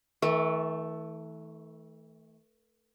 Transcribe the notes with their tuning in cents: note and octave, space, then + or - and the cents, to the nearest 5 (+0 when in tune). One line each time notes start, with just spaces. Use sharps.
E3 -40 A3 +0